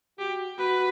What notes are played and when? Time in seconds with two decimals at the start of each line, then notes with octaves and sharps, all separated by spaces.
0.18 F#4 G4
0.58 F#4 B4